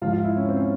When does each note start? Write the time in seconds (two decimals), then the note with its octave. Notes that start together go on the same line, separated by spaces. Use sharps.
0.02 G#2 F3 F4
0.13 F4
0.24 E4
0.37 C#4
0.49 C4
0.57 C#4